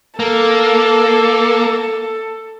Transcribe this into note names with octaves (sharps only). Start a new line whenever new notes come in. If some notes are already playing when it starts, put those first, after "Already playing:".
A#3 A4